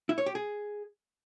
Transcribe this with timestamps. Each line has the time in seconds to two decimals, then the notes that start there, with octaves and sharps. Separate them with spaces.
0.09 E4
0.18 C#5
0.26 G4
0.35 G#4